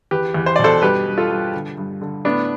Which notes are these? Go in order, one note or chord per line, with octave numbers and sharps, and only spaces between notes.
E2 G4 B4
E2
C5
B2 D5
A4 C5
G2 G4 B4
G2
F4 A4
G2
D3
G2
D3
A2 B3 D4